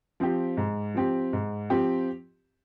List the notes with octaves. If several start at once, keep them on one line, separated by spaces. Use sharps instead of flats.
F3 C4 G4
G#2
F3 C4 G4
G#2
F3 C4 G4